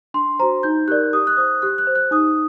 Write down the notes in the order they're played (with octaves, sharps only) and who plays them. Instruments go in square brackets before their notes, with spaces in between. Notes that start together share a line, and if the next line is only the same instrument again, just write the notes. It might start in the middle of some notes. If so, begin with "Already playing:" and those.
[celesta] D4 C6
F#4 C5 A#5
D#4 G6
G4 A#4 D5 F#6
G4 D#6
F#6
C5 D#6
G4 F#6
F#6
C5
F#6
D#4 D#6